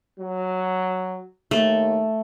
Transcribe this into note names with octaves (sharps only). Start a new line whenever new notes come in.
F#3
D#2 A3